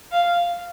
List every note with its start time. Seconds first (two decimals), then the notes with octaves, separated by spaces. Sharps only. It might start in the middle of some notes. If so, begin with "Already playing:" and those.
0.12 F5